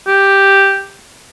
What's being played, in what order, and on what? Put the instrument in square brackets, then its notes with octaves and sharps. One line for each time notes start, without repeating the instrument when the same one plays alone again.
[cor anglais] G4